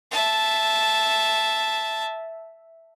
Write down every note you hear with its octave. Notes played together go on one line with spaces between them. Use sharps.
E5 A5